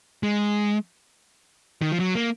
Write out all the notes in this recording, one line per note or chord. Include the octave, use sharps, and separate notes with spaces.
G#3
D#3
F3
F#3
A#3